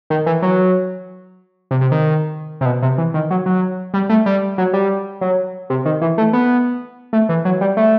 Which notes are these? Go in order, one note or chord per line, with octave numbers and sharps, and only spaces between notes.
D#3
E3
F#3
C3
C3
D#3
C3
B2
C3
E3
D#3
F#3
F#3
G3
A3
G3
F#3
G3
F#3
C3
D#3
E3
A3
B3
A3
E3
F#3
G3
A3